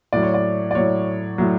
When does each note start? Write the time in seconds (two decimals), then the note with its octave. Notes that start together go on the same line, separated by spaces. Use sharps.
0.13 A2 F#3 D5
0.23 C#5
0.34 D5
0.71 D5
0.75 A2 F#3 C#5
1.38 A2 F#3